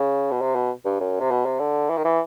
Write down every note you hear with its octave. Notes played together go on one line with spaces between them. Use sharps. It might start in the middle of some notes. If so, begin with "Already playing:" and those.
Already playing: C#3
B2
C3
B2
G2
F#2
C3
B2
C3
D3
E3
D#3
E3